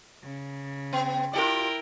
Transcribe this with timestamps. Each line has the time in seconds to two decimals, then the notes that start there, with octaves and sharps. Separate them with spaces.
0.23 C#3
0.93 B3
1.33 E4 F4 G4 A#4 D5 G5